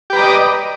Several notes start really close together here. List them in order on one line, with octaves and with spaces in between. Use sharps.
G4 B4 A#5 D5 D#5